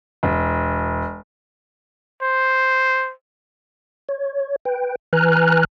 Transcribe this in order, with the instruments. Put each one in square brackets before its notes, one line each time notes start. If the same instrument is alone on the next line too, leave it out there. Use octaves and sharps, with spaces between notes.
[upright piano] E1
[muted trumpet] C5
[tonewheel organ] C#5
B4 G5
E3 B4 G#5 A#5 F6 F#6